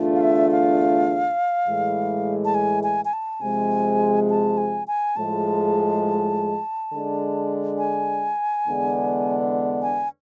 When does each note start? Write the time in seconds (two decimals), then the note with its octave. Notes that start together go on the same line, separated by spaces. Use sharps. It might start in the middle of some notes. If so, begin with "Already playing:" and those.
Already playing: E2 D3 A3 D4 F4
0.15 F5
0.21 E5
0.51 F5
1.67 A2 E3 G#3
2.45 A5
2.54 G#5
2.83 G#5
3.05 G#5
3.13 A5
3.41 C3 F3 G#3 G#5
4.30 A5
4.58 G#5
4.88 G#5
5.16 A2 F3 G#3 A5
6.91 D3 G#3 D4
7.78 G#5
8.66 E2 D3 G#3 B3 D4
9.82 G#5